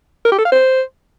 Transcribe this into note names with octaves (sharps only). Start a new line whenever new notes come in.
A#4
G4
A4
F5
C5